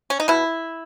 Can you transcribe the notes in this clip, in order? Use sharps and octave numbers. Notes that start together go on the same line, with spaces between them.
C#4
D#4
B2 E4